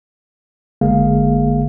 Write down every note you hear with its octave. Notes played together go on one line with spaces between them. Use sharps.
G#1 D3 G#3 A#3 G#4 F5